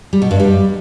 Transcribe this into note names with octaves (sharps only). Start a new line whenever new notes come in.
G3
B2
G2
G3